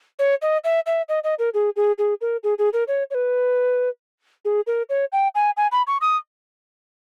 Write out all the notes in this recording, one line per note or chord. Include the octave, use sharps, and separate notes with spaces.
C#5
D#5
E5
E5
D#5
D#5
A#4
G#4
G#4
G#4
A#4
G#4
G#4
A#4
C#5
C#5
B4
G#4
A#4
C#5
G5
G#5
G#5
B5
C#6
D#6